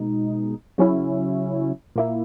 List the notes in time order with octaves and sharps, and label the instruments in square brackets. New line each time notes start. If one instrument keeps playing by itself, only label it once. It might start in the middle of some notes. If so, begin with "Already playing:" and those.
Already playing: [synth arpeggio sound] B2 G#3 D#4
C#3 F#3 C#4 E4
A#2 A#3 E4